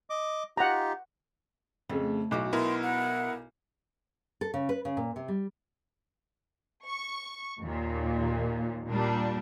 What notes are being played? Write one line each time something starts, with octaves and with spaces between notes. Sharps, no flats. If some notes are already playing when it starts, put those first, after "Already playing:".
D#5 D6
D#4 F4 G4 F#5 A#5
F2 C#3 A3
B1 B3 E4 F#4 D6
B2 B3 E4 A#4 C6
F#5
A4
C#3
B4
C#3
A#2
C3
G3
C#6
D#2 A#2
A#2 G3 D4